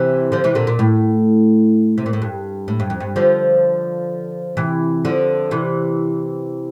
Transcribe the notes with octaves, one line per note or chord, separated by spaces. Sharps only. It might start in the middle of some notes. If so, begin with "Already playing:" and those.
Already playing: C3 E3
D3 F3
C3 E3
A#2 D3
A#2
A2
C3
A#2
A2
G2
A2
G2
F2
G2
D3 F3
C3 E3
D3 F3
C3 E3